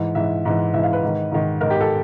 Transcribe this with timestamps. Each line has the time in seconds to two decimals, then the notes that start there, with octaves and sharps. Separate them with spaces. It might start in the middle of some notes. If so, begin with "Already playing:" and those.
Already playing: G#2 E3
0.15 G#2 E3 E5
0.45 G#2 E3
0.74 G#2 E3 E5
0.83 F5
0.93 B4
1.03 G#2 D#3
1.32 G#2 D#3
1.61 G#2 D#3 A#4
1.70 G4
1.81 A4